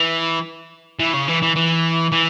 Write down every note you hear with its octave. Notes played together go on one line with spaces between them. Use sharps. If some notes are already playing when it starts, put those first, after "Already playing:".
Already playing: E3
E3
C#3
E3
E3
E3
E3